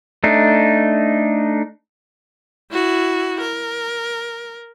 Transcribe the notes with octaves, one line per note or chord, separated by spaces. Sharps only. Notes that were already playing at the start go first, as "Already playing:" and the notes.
A3 D4 D#4
E4 F#4
A#4